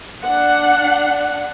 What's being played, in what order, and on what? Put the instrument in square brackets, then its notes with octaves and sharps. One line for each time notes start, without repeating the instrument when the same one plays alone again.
[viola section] D4 F#5